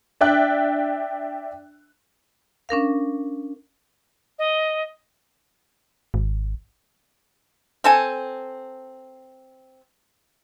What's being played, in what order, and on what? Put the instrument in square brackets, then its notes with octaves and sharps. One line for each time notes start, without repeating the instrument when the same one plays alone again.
[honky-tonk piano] D4 D5 E5 G5 F#6
[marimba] C#4 D4 A#4 F5
[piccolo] D#5
[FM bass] G#1
[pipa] C4 A4 G#5